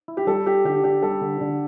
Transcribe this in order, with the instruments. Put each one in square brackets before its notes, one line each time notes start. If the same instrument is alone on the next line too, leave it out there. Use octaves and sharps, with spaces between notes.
[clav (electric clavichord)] E4
[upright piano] G4
[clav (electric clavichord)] G3 [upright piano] A4
[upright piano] G4 [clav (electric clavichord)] A4
[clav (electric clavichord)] D3 [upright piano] G4
[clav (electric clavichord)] D4 [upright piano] G4
[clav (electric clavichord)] G3 [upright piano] A4
[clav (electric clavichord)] D3
D3